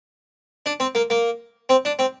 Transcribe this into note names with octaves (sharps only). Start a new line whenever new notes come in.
D4
C4
A#3
A#3
C4
D4
C4